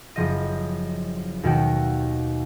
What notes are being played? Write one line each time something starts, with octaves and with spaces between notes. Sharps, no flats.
F#1 F3 D#5
D#2 B2 D#3 F#4 G5